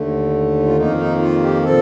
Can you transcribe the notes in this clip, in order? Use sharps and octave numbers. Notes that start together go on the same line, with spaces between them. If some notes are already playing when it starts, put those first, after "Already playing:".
Already playing: D#2 D3 A3
F4
F2 D#3 A#3 D#4
D#4
F4
G4
A#2 F3 C4 A4